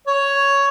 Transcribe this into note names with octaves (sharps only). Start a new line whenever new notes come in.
C#5